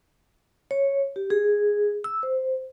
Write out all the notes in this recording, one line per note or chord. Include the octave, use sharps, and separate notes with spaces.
C#5
G4
G#4
E6
C5